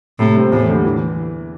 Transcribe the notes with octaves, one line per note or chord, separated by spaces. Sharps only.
A2 C3
G3 C4
E2 A2
D3 G3
E3